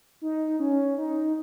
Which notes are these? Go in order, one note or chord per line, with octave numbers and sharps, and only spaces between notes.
D#4
C#4
D#4